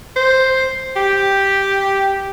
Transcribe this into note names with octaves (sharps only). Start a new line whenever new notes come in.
C5
G4